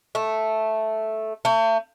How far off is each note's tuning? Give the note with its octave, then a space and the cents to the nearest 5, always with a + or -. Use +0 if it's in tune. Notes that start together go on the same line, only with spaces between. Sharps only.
A3 -5
A3 +35